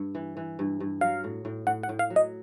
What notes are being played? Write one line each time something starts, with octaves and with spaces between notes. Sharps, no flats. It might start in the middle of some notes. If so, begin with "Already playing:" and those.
Already playing: G2
E3
E3
G2
G2
F#3 F5
A2
A2
A2 F#5
F#5
A2
F5
F#3
D#5